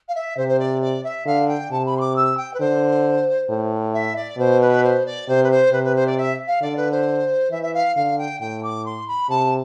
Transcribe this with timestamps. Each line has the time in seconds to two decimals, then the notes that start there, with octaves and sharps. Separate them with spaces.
0.08 F5
0.15 E5
0.37 C3 C5
0.48 C5
0.59 D5
0.81 D5
1.04 E5
1.26 D3 F5
1.48 G5
1.71 C3 A5
1.85 B5
1.97 C6
2.00 D6
2.16 E6
2.37 G5
2.54 B4
2.60 D3 C5
3.49 A2
3.94 E5
4.16 D5
4.38 B2 C5
4.61 B4
4.83 C5
5.05 D5
5.28 C3 C5
5.43 B4
5.51 C5
5.72 C3 B4
5.84 B4
5.95 C5
6.06 D5
6.17 E5
6.47 F5
6.62 D3 D5
6.76 B4
6.91 C5
7.51 E3 E5
7.62 E5
7.74 F5
7.96 D3 F5
8.18 G5
8.40 A2 G5
8.63 D6
8.85 C6
9.08 B5
9.29 C3 A5